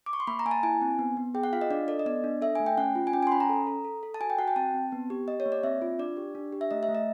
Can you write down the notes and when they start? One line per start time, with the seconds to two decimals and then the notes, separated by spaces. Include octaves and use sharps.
0.06 D6
0.13 C#6
0.20 C6
0.27 A#3 B5
0.39 A#5
0.45 A#3 G#5
0.51 A5
0.63 E4 G#5
0.82 C4
0.99 B3
1.17 B3
1.34 G#4 G5
1.43 F#5
1.53 F4 F5
1.61 D#5
1.70 D4 D5
1.88 A4 D5
1.99 D#5
2.06 B3 D5
2.24 D4
2.42 A4 E5
2.55 A3 G#5
2.66 G5
2.77 C#4 F#5
2.95 F4
3.07 G#5
3.13 C#4 G5
3.23 G#5
3.27 C6
3.32 C#4 B5
3.40 A#5
3.49 A4
3.67 A4
3.84 A4
4.03 A4
4.14 A5
4.21 F#4 G#5
4.30 G5
4.38 F#4 F#5
4.48 G5
4.56 C4 A5
4.74 C4
4.92 B3
5.10 G4
5.28 G4 D#5
5.40 C#5
5.46 A#3
5.52 D5
5.63 C4 E5
5.82 F4
5.99 D4 D5
6.17 G4
6.35 D4
6.53 G4
6.61 E5
6.71 A3 D#5
6.83 E5
6.88 A3
6.95 D#5